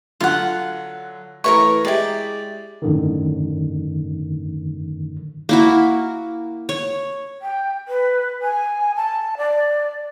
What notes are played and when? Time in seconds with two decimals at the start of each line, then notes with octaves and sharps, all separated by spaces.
0.20 D3 F#3 F4 F#5
1.44 E3 A3 A#4 B4 C#5 C#6
1.85 G#3 E4 G4 D5
2.82 F#2 A2 D3 D#3
5.49 A#3 E4 F#4
6.69 C#5
7.42 G5
7.88 B4
8.42 G#5
8.96 A5
9.37 D5